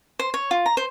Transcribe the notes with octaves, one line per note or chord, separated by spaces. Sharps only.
C5
C#5
F4
A#5
C5